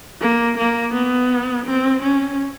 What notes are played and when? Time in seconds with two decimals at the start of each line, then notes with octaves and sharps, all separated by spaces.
0.21 A#3
0.58 A#3
0.94 B3
1.66 C4
2.02 C#4